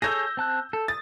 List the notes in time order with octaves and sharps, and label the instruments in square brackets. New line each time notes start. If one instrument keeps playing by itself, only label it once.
[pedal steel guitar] G#4 A4 C#5 [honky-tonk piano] E6 G6 A#6
[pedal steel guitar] C4 A5 F#6
A4
[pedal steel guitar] D#6 [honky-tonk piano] A6